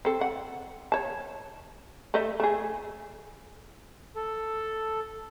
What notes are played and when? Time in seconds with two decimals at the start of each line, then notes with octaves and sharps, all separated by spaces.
0.05 C4 A4
0.21 F#5
0.92 C#5 A5
2.14 A3 D#5 E5
2.40 A3 G#4
4.16 A4